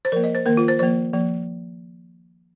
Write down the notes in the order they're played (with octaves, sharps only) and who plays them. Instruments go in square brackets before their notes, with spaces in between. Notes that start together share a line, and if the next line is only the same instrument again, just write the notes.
[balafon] C5
F3 A#3 A#4
D#5
C5
D#3 A#3 A#4
F4
C5
F3 A#3 C5
F3 A#3